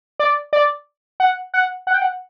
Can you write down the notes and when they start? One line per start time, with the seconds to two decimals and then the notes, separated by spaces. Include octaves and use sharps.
0.19 D5
0.53 D5
1.20 F#5
1.54 F#5
1.87 F#5
1.94 G5
2.02 F#5